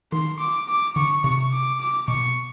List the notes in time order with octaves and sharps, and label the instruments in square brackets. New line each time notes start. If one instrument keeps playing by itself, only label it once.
[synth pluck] D#3 [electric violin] C6
[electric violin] D6
D6
[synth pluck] D3 [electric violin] C#6
[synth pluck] C3 [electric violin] C#6
[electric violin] D6
D6
[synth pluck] B2 [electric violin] C#6